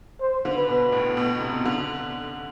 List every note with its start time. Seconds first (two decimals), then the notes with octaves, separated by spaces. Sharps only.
0.21 C5
0.45 D3
0.56 B4
0.68 B2
0.92 A2
1.17 B2
1.41 C3
1.65 D3